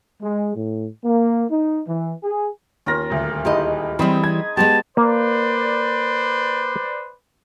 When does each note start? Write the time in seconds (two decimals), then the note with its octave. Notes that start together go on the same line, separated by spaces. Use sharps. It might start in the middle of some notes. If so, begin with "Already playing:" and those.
0.21 G#3
0.54 A2
1.04 A#3
1.50 D#4
1.87 E3
2.24 G#4
2.86 D#2 C#4 F4 A#4 A#6
3.10 D#1 D2
3.45 G#3 D#4 E4 G4 A4 D#5
3.99 E3 G3 C4 D#5 B5 C6
4.24 G#6
4.57 G#3 B3 G4 C5 A5
4.97 A#3 B4 C5 D5